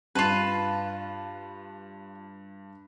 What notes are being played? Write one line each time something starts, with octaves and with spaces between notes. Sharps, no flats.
G2 F4 B4 A5 E7